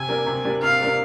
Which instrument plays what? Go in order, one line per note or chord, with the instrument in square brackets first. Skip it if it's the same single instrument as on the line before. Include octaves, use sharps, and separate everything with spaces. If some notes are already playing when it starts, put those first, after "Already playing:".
Already playing: [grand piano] C3 [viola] G#5
[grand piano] G3 A#3 D4
C3
G3 A#3 D4
[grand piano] C3 [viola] F5
[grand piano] G3 A#3 D4